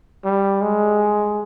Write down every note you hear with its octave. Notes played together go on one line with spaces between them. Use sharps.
G3
G#3